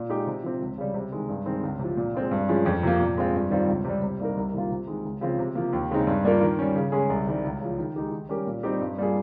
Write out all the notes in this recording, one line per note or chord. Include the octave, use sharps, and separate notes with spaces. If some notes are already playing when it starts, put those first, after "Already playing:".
Already playing: A#2
G#3 D#4 G4
C3
F3 C4
C#2
C#3 G3
C3
D#3 G#3
G2
D#3 G#3 C4
C#2
C3 F3
A#2
G#3 C4 F4
G2
F3 G#3 C#4 G#4
F2
C3 F3 A#3
A#2
G#3 C4 F4
G2
D#3 G3 C4 F4
C#2
C3 G3
C3
G3 A#3 D#4 A#4
C2
C3 D#3 A#3 F4
C3
D#3 G#3
C#2
C#3 F3 C4 F4
C3
F3 A#3
D#2
C#3 G#3 C4 D#4
G2
G3 A#3 F4 A#4
D#3
G3 C#4
C#3
G#3 C#4 G#4
C2
C3 D#3 G3
C#2
C#3 F3
D#3
G#3 D#4 G4
D#3
G3 C#4 G4 A#4
A#2
G3 C4 D#4 G4
G2
G3 A#3 F4 G#4